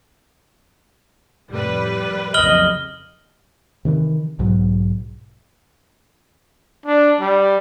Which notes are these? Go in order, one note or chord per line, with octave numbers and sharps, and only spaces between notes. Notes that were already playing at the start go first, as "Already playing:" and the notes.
F1 A2 G3 B4
F#1 B1 F2 D#5 F6 F#7 G7
C3 D#3 E3
B1 G#2 B2 F#3
D4
G3